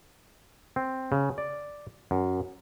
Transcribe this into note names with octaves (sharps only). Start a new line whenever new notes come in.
C4
C#3
D5
F#2